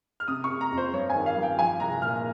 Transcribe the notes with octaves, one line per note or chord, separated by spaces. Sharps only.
F6
C3 D#6
C#6
C3
A#5
F2
C5
G2 C#5
G#5
D#3
F5
G2
G5
F3 G#5
C2 A#5
A#2 F6